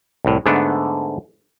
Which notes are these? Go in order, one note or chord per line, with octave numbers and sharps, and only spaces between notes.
C2 A2
G#2 D3 A3 B3 D4